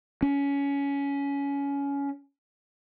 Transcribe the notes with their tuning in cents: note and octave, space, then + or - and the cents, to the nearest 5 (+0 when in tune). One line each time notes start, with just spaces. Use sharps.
C#4 +20